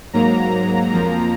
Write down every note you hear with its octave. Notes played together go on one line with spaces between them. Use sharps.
G#2 F#3 A#3 A#5
F2 F3 A#3 A#5